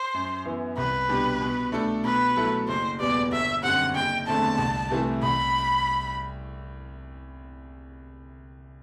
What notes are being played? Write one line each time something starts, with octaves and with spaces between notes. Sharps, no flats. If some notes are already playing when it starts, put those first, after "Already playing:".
Already playing: C5
F#2
E3 B3 E4
C2 B4
B2 G3 D4 G4
B2
A3 D4 A4
B2 B4
F#3 A3 E4 A4
F#1 C5
E2 B2 G3 B3 D5
G1 E5
F#2 D3 G3 C4 F#5
F#1 G5
E2 D3 A3 C4 A5
C2
C3 E3 A3 E4
C2 B5